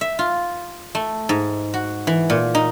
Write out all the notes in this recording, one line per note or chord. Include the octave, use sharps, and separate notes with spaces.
E5
F4
A3
G#2
F#4
E3
A#2
D#4